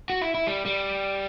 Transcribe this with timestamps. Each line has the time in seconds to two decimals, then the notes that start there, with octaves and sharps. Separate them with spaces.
0.10 F#4
0.22 E4
0.35 E4
0.47 G3
0.66 G3